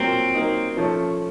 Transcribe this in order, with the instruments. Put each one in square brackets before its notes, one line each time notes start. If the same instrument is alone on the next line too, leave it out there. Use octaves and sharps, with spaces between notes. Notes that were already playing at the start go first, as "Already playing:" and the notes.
Already playing: [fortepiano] A#2 F#3 A#3 [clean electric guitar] C4
[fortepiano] F#3 A#3 D#4
F3 A3 C#4